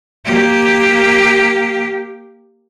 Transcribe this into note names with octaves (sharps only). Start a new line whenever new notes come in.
A#3 G4